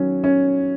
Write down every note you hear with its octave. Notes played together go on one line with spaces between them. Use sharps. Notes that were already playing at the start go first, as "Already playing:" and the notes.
Already playing: D#3 F#3 C#4
C#4